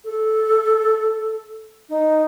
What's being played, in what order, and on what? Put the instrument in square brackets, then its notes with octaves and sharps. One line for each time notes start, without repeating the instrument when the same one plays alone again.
[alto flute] A4
D#4